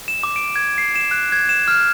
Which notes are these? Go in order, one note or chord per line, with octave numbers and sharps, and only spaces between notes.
E7
D6
D7
G#6
C7
E7
F#6
G#6
E7
F6